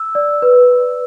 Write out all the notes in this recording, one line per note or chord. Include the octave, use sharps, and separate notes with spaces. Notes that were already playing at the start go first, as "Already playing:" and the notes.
Already playing: E6
D5
B4